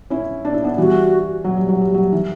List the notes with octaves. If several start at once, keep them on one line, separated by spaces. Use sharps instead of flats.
C#4 E4
D4
E4
B3 D4
E3 G3 F#4
F#3
G3
F#3
G3
F#3
E3